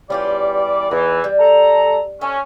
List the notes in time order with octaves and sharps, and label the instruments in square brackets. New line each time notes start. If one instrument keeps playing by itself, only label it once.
[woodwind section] E2 G3 D5 [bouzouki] C#4 F4 G4
[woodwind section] E2 E3 [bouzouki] D#4
[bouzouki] G3
[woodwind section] A4 A#5
[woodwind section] C#4 [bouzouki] A4 E5